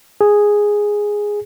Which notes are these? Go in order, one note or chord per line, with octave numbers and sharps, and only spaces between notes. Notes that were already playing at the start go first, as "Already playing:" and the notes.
G#4